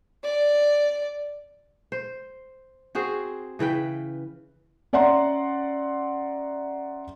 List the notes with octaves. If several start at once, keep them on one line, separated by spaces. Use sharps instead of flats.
D5
C5
C4 F#4 G#4 C5
C#3 E3 B4 G5
C#4 D5 E5 F#5 A#5 C6